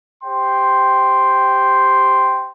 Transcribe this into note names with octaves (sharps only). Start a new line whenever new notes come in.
G4 C5 G5 C6